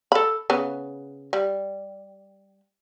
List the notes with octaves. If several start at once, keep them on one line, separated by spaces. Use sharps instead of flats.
A4 B5
C#3 B3
G3